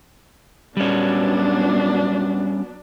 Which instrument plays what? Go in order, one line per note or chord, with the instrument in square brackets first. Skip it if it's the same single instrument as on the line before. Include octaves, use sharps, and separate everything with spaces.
[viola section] F#3 B3 D4 [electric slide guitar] G3 C#4